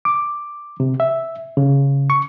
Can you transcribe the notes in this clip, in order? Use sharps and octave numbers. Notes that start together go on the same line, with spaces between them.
D6
C3
E5
C#3
C#6